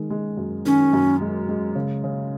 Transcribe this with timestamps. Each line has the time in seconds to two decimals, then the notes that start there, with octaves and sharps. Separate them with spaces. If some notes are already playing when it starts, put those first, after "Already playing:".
Already playing: D#3 G#3
0.10 G#3
0.37 F#2
0.65 D#3 C#4
0.93 F#2
1.21 G#3
1.49 G#3
1.75 C#3
2.04 C#3